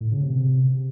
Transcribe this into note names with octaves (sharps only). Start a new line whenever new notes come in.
A2
C#3
C3